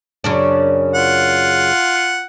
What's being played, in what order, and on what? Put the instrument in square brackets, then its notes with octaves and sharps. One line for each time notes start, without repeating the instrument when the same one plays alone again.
[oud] F#2 C#3 D4
[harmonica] F4 F#5